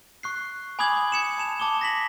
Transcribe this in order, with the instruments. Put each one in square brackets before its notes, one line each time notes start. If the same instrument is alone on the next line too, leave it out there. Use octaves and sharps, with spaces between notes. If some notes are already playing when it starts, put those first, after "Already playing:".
[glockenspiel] C#6 F#6 C7
G#5 B5 D6 D#6 G#6 F#7
G#6 C#7 E7
A5 E7 F7
A5 D6 D#6 G7
A#6 B6 F#7